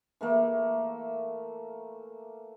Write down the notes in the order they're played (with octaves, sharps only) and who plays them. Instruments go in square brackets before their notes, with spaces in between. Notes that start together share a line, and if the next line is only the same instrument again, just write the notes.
[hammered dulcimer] E3 A3 A#3